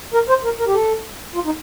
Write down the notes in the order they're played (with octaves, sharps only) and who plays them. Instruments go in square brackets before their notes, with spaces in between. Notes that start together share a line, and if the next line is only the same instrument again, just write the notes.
[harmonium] A#4
C5
A#4
A#4
G4
A4
F4
D#4